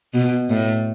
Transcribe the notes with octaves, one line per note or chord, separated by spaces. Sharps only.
B2
A2